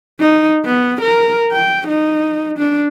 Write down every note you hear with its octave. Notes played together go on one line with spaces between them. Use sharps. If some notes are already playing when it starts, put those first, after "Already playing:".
D#4
B3
A#4
G5
D#4
D4